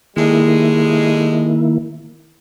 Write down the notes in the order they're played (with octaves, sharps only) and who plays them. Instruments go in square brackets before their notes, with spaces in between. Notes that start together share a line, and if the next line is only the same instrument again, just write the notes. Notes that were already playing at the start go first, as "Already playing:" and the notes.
[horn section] A2 G3 G#3 [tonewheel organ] D#3 A#3 E4